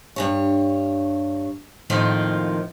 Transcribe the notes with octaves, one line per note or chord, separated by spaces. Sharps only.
G2 B2 C#5
F2 A2 D#3 F3 A#3 F4